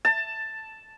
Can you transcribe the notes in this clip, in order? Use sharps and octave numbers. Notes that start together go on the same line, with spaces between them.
A5